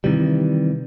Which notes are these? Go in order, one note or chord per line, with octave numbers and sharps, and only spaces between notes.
C3 D#3 E3 G3